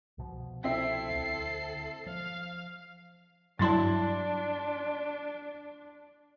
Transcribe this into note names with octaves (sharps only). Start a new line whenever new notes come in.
C2 B2 F3
C4 E4 A4 E5 C7
D2
F3 F5
G2 F#3 D4 E4 A5 C6 A6